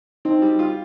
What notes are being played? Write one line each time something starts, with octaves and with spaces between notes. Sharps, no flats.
C4 D#4
G3
F4